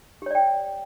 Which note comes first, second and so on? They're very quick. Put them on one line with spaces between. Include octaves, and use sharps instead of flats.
G4 C#5 D5 G5